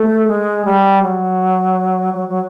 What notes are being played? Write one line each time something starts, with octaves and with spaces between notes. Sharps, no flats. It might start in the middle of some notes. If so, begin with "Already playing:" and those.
Already playing: A3
G#3
G3
F#3
F#3
F#3